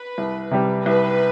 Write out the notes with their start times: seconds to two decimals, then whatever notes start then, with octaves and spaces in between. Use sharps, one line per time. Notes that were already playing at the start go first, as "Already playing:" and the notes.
Already playing: B4
0.18 C2
0.51 C3 G3
0.85 C2 B4